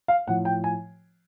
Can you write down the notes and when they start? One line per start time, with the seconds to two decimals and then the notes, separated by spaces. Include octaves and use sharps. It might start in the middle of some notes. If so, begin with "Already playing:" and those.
0.08 F5
0.27 A2 F3 F#5
0.45 G5
0.64 G#5